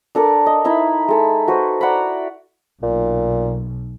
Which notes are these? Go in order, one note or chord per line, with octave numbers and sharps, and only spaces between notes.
D4 A4 A#4 D5
D#5
D#4 E4 E5 B5
G#3 A4 B5
F#4 B4 C5
D5 F#5 A#5 B5
B1 A#2